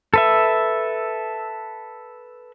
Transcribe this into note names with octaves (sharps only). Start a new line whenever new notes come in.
A4 B4 E5